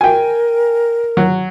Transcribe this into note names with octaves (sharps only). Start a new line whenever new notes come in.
A#4 G5 G#5
F#3